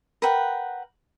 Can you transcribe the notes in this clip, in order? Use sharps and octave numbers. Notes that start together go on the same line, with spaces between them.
A#4 B4 F#5 G5